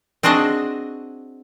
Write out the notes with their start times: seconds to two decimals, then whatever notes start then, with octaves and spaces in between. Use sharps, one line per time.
0.23 C4 D4 F#4 G#4 D#5 A5